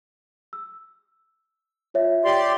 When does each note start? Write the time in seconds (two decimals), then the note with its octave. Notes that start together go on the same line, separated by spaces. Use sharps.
0.53 E6
1.94 F4 C#5 E5
2.25 G4 D5 C6